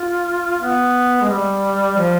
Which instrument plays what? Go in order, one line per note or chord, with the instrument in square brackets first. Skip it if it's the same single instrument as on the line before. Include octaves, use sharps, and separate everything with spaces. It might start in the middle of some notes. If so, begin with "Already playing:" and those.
Already playing: [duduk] F4
B3
G#3
G3
F3